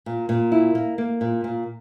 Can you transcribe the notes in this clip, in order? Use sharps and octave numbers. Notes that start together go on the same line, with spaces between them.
A#2
A#2
E4
A#3
A#3
A#2
A#2